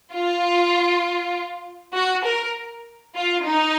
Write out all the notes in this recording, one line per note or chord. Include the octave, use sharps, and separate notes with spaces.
F4
F#4
A#4
F4
D#4